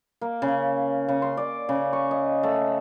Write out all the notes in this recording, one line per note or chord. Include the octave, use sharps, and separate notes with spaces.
A#3
C#3
C#3
C6
D5
C#3
C#6
D#5
A3